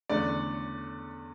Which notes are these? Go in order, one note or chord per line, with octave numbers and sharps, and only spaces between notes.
E2 D3 A3 C#4 D5